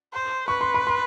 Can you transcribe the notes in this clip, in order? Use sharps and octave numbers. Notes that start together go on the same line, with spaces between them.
C5
B4 C#6
C6
B5
C6